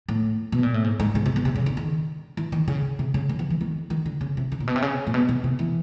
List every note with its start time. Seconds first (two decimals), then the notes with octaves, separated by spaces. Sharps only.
0.09 A2
0.52 B2
0.63 A#2
0.74 A2
0.84 G#2
1.00 G#2
1.15 C#3
1.26 C3
1.36 B2
1.45 C3
1.56 C#3
1.66 D3
1.77 D#3
2.37 E3
2.52 D#3
2.68 C#3
2.99 C3
3.14 C#3
3.29 D#3
3.39 F3
3.50 E3
3.61 D#3
3.90 D#3
4.06 D3
4.21 C#3
4.37 C3
4.52 C#3
4.60 A#2
4.67 B2
4.76 C3
4.82 C#3
5.07 A#2
5.14 B2
5.29 B2
5.44 C3
5.59 E3